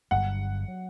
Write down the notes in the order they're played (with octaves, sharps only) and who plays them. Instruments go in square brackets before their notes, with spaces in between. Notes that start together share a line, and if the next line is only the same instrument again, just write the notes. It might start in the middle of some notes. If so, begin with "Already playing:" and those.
[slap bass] G1 G2 F#3 [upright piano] F#5
[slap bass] F#3